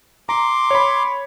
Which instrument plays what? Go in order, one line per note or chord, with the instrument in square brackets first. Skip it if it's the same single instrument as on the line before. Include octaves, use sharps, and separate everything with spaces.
[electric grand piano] A#5 [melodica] C6 D6
[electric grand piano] C#5 B5